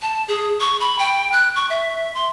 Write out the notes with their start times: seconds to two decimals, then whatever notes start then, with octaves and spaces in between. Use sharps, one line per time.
0.02 A5
0.28 G#4
0.60 C#6
0.80 B5
0.99 G5
1.32 F#6
1.56 C#6
1.70 E5
2.14 C6